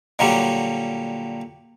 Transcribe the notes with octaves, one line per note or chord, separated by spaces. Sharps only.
A#2 D3 F#3 G3 G4